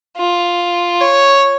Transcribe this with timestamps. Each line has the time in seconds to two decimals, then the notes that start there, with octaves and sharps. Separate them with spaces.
0.17 F4
1.01 C#5